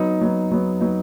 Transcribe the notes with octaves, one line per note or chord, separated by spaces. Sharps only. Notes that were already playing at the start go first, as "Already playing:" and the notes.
Already playing: F#3 B3 D#4
F#3 B3 D#4
F#3 B3 D#4
F#3 B3 D#4